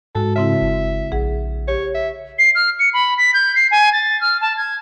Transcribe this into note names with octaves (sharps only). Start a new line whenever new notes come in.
G#2 G#3 F#4 A4
C#3 C4 E4 E5
F#1
A#1 G#4 F#5
G4 C#5
E5
C7
F6
C#7
B5
B6
G6
C7
G#5
A6
F6
A5
G#6